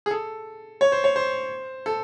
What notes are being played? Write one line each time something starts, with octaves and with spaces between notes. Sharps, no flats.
G#4
A4
C#5
C5
C#5
C5
A4